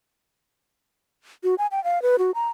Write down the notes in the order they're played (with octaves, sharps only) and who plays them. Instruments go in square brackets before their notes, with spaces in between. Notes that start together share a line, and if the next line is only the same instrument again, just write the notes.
[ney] F#4
G#5
G5
F5
B4
F#4
A#5